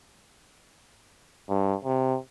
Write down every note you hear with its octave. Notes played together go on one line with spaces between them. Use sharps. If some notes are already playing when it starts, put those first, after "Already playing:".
G2
C3